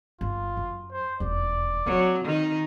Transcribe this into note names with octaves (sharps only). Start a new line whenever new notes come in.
G1 F4
F#2
C5
E1 F2 D5
F#3 C4
D#3 D#4